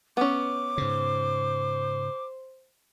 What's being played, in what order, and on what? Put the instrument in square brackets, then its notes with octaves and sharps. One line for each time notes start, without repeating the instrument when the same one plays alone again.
[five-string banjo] B3 C#4 [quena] D6
[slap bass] G#2 C#3 [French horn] C5